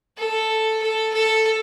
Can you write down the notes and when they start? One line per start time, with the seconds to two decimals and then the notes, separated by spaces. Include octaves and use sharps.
0.18 A4
0.82 A4
1.14 A4